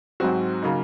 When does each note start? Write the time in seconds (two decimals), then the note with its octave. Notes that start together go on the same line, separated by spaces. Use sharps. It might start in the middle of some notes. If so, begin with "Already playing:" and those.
0.20 G#2 F#3 C4 F#4
0.63 C#3 F#3 A#3 D#4